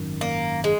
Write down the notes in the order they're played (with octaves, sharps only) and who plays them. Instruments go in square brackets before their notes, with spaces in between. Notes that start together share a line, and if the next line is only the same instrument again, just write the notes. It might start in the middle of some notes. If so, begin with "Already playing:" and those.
Already playing: [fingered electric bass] G#1 F#2 D#3
[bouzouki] A#3
G#3